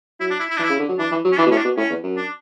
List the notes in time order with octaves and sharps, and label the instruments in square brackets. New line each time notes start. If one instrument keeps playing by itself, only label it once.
[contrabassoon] F#3 [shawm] E4
[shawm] D4
E4
E4
[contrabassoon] E3 [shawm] D4
[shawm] E4
[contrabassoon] C#3
D3
F#3
[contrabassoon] E3 [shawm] D4
[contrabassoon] E3
F#3
[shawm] C#4
[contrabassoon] E3 [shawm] D4
[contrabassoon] B2
[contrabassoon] A2 [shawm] C#4
[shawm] D4
[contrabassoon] B2
[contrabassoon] A2 [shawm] C#4
[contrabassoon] E2
F#2
[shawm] D4